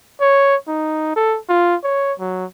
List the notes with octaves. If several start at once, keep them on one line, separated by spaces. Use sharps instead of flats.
C#5
D#4
A4
F4
C#5
F#3